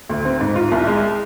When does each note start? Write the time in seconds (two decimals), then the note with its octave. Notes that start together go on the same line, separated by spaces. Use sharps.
0.09 D2
0.25 C4
0.40 G#2
0.56 F4
0.72 C2
0.87 G#3